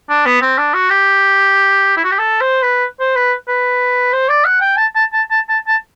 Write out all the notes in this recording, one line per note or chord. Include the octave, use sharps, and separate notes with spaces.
D4
B3
C4
D4
F#4
G4
E4
F#4
G4
A4
C5
B4
C5
B4
B4
C5
D5
F#5
G5
A5
A5
A5
A5
A5
A5